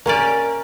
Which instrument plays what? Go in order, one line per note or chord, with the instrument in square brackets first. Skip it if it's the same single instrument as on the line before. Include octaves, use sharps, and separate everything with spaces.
[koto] A#3 C#4 G4 D5 [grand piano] A#4